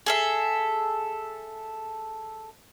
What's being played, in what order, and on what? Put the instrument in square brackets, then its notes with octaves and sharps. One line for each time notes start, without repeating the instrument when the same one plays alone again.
[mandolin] G#4 A4 E5